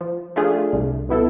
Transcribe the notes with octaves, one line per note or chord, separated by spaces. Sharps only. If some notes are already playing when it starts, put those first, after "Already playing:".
F3
A3 D4 F4 G#4
C2
B2 B3 E4 A4